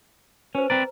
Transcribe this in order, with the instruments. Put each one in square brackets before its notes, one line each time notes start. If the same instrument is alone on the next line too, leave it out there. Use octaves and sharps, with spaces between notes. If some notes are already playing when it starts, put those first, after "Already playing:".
[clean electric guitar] C#4 [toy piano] B4 C5
[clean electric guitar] C4 B4 D5 [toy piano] A#5